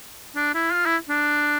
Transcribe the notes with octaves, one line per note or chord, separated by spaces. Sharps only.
D4
E4
F4
E4
D4